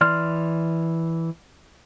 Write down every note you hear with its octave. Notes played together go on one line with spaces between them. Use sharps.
E3 D5 C6 F6